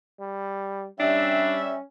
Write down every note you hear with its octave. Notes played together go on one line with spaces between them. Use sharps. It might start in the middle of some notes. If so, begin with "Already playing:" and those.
G3
G3 C#4 D4 E5